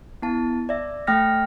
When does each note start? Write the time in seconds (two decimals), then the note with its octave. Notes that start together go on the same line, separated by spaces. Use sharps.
0.22 B3 E4 A5
0.69 D5 E5
1.07 A3 G5 F6 A#6